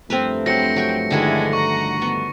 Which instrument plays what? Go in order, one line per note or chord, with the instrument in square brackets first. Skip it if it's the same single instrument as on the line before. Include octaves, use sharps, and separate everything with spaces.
[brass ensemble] G2 F3 A3 [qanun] C4 A#4 B4
[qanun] F#3 [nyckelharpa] C4 [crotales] A#6 C#7
[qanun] F#3 G5 C#6
[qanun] D3 D#3 F#4 [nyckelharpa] G#3 E4
[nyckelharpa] F#5 A#5 [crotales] C#6
[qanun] B3